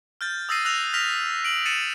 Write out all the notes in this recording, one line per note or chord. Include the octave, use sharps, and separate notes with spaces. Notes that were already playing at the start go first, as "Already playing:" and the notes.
F6 G6 A6
D#6 E6 A6 A#6 C7 D#7
E6 F#6 A#6 F7
F6 A#6 B6 F7
D7 F#7
A6 C#7 D#7 E7